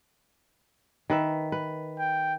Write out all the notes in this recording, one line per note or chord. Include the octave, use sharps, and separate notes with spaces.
D#3 B4 E5
B4
G5